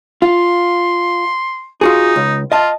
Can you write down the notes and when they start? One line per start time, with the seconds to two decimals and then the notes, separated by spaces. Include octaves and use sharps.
0.22 F4 C6
1.81 D#4 F4 F#4 G#4
2.16 C#2
2.52 F4 D#5 A5